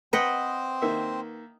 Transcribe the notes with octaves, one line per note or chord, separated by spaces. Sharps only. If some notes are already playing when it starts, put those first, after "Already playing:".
C4 B4 C5 D#5 F#5 G5
D#3 A#3 E5